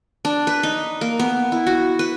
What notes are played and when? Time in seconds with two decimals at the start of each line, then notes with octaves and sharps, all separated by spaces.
0.25 D4
0.47 B4
0.63 D#4
1.01 A#3
1.19 B3
1.52 E4
1.67 F#4
1.99 B4